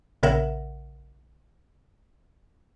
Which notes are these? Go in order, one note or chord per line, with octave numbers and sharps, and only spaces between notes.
A#1 C#3 A#4 E5 F#5